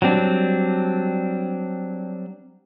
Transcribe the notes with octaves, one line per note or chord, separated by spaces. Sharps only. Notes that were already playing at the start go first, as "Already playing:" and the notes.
F#3 G3 C4 D4